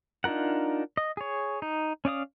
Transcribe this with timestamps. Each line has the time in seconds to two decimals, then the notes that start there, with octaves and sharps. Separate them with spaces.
0.24 D4 D#4 F4 A#4 F#5
0.97 D#5
1.17 G#4 C#5
1.62 D#4
2.05 C#4 D5 F5 D#6